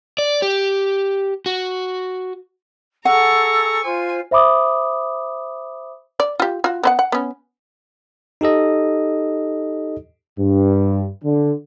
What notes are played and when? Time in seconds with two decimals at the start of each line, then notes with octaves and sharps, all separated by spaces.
0.18 D5
0.42 G4
1.46 F#4
3.05 G#4 A4 F#5 A#5 C#6 E6
3.84 F4 C5 G#5
4.31 C5 E5 B5 D6 D#6
6.20 D5
6.40 F4 G4
6.64 F4 F#4
6.83 B3 C5 F#5
6.99 F#5
7.12 B3 C#4
8.41 D#4 G4 A4 D#5
10.40 G2
11.24 D3